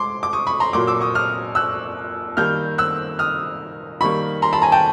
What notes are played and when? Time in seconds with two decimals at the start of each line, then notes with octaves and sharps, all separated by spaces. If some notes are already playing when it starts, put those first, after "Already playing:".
Already playing: G#3 C6 D6
0.23 D6
0.33 C#6 D#6
0.47 B5 C#6
0.60 A#5 C6
0.73 A#2 F#3 A#3 C6 D6
0.87 D6 E6
1.01 C#6 D#6
1.15 D#6 F6
1.55 E6 F#6
2.37 D#3 G3 A#3 F6 G6
2.78 E6 F#6
3.19 D#6 F6
4.00 D#3 G3 A#3 B5 C#6
4.42 A#5 C6
4.53 A5 B5
4.62 G#5 A#5
4.72 G5 A5